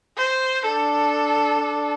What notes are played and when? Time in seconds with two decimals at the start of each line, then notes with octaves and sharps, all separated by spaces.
0.18 C5
0.64 D4 A4
1.60 D4